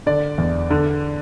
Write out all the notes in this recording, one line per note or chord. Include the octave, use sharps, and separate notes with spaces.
D3 D5
E2
D3